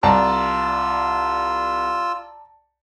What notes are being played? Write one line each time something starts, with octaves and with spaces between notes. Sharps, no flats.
C2 F4 D5 A5 A#5 E6